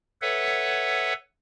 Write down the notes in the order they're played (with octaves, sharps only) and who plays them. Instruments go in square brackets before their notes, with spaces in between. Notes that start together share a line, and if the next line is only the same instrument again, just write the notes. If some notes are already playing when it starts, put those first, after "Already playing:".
[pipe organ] A4 B4 C#5 E5 F#5